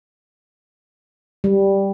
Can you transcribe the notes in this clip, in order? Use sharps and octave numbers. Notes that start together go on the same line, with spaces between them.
G3